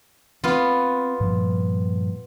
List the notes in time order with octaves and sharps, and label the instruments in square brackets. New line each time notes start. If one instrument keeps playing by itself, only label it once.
[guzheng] B3 F4 [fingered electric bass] C4
[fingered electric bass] G2 A#2 F3